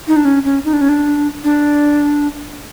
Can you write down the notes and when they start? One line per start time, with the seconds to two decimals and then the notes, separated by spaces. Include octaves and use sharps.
0.08 D#4
0.16 D4
0.25 C#4
0.45 C#4
0.65 D#4
0.73 D4
0.81 C#4
0.89 D4
1.44 D4